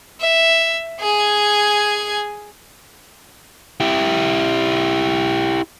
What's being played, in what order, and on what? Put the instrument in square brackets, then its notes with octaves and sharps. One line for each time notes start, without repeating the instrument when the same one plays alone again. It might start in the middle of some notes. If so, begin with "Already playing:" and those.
[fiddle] E5
G#4 G#5
[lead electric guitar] E4 G4